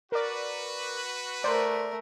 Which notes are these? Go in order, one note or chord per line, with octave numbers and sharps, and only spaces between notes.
F#4 A#4 B4 D5
A3 A#4 C5 D5